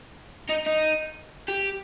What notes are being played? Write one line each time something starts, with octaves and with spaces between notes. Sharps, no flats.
D#4
D#4
G4